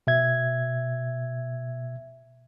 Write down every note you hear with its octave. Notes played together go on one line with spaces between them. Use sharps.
B2 E5 G#6